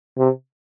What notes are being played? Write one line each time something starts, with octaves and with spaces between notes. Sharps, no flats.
C3